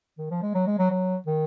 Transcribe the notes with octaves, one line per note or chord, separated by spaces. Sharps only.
D#3
F3
G#3
F#3
G#3
F#3
F#3
D#3